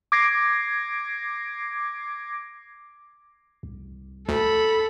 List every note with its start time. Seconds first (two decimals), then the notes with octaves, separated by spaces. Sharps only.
0.12 D6 G#6 A#6 C7 D7
3.63 C2
4.29 D2 A4 B5